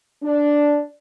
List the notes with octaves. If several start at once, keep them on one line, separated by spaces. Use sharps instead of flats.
D4